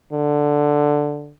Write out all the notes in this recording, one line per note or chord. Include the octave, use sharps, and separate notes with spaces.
D3